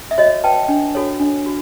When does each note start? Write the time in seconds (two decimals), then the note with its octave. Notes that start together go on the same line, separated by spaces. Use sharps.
0.11 E5
0.18 F#4 C#5 D#5
0.44 B4 G5 A5
0.68 D4
0.95 F#4 A4 C#5
1.20 D4
1.46 F#4